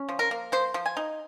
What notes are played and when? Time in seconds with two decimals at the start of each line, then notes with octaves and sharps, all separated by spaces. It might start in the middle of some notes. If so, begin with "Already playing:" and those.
Already playing: C#4
0.09 F3
0.19 A#4
0.31 A#3
0.52 F3 C5
0.74 F3
0.86 G#5
0.97 D#4